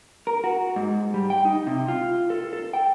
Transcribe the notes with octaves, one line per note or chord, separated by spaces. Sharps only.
A#4
F#4
G#2
G3
G5
D#4
C3
F4
A4
A4
G5